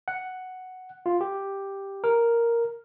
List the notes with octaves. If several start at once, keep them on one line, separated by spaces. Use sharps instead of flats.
F#5
F4
G4
A#4